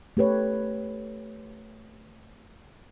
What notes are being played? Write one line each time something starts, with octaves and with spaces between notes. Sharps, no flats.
A3 G4 B4 C#5